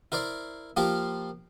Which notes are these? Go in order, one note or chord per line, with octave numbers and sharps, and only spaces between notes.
E4 A#4 C5 D5
F3 A#3 F4 G4 A#4